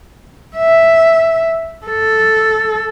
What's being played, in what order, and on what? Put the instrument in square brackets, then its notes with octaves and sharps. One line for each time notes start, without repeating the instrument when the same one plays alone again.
[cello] E5
A4